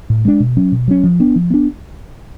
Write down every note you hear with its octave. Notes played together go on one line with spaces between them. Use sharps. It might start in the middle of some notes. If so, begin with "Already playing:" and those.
A2
G#3 B3 D4
B2
F#3 C#4
B2
F#3 C#4
F3
B3 D4
F3
B3 D4